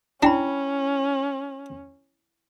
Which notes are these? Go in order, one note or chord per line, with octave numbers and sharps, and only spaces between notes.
C#4 D4 E4 G5 B5